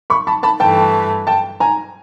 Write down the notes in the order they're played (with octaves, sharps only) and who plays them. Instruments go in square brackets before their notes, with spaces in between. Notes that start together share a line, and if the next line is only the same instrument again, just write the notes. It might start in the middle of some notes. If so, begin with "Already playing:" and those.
[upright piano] B5 C#6
A5 B5
A5 B5
[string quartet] G2 E3 A3 [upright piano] G5 A5
[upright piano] G5 A5
G#5 A#5